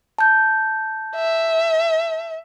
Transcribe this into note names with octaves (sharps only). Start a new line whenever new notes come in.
A5 G6
E5